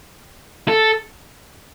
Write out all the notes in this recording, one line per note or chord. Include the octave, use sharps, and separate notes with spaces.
A4